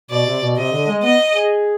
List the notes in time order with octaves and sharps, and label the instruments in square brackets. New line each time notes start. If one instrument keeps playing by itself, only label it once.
[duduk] B2 [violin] D5
[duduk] C3
B2
[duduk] C3 [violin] D#5
[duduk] D3
G#3
[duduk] B3 [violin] D#5
[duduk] G#4